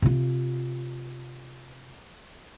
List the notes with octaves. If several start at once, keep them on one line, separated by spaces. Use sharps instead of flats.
C3 F4